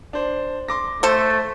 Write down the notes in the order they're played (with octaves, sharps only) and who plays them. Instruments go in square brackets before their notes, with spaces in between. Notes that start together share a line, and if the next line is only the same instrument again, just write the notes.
[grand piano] D4 C5
C6 D6 A#6
[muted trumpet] A3 [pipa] A4 C5